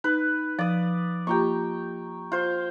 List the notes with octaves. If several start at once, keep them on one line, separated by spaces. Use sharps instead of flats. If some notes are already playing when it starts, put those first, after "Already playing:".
D#4 B4
F3 D5 D#6
A#3 F4 G4 G5 A#5 C#6
F4 C5